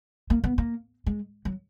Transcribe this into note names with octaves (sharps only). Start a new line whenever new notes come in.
A#3
B3
A#3
G#3
F#3